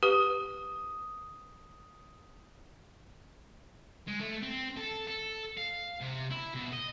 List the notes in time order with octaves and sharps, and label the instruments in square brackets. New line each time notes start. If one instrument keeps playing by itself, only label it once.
[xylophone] G4 B4 G7 [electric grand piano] D#6
[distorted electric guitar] G#3
A3
C4
A4
A4
F5
C3
E4
B2
D#5